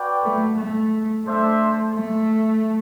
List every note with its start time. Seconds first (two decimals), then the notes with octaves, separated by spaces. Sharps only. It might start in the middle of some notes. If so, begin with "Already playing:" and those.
Already playing: F#4 B4 D5 G5
0.23 A3
0.57 A3
1.25 A3 D4 A4 C5 E5
1.93 A3